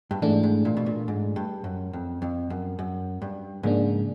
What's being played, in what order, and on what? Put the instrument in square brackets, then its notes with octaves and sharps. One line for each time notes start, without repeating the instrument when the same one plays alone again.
[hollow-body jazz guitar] G2
[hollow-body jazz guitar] G#2 [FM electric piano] E3 A3 D4
[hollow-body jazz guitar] G#2
A#2
B2
A#2
G#2
G2
F#2
F2
F2
F#2
F#2
G2
[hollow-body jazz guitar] G#2 [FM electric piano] C#3 F3 A#3 D4